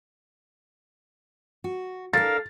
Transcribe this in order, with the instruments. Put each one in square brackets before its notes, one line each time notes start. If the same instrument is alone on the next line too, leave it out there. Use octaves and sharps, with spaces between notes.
[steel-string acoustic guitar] F#4
[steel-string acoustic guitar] D4 A4 [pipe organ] A#4 F5 [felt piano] A6